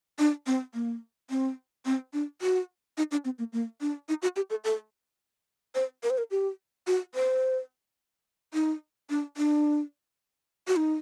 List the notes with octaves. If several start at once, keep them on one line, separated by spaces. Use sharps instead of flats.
D4
C4
A#3
C4
C4
D4
F#4
D#4
D4
C4
A#3
A#3
D4
D#4
F#4
G4
A4
A4
C5
A#4
C5
A#4
G4
F#4
C5
D#4
D4
D4
F#4
D#4